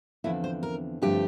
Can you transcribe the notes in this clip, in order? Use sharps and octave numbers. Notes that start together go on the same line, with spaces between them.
E2 D3 F3 C4 E4
C5
A#4
G2 D3 F3 A3 C4 G4